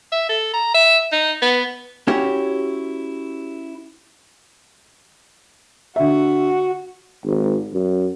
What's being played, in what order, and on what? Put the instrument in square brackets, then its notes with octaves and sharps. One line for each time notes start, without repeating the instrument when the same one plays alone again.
[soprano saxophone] E5
A4
A#5
E5
D#4
B3
[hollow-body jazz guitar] C#4 E4 F#4 G4 C#5
[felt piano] D3 E5 [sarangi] F#4
[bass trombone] G#1
F#2